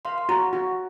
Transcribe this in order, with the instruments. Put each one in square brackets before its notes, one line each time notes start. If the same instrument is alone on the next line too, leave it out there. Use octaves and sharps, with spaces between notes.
[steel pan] F5 [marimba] C6
[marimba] C6
[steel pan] F#4 [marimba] A#5
[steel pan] F#4